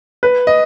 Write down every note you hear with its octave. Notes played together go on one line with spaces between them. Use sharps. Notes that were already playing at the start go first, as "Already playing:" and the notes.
B4
D#5